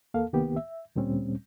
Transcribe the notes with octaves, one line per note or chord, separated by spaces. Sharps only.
D#2 A#3 A4 F5
C2 D#3 A#3 B3 G4
E5
D2 A#2 G3 C4 C#4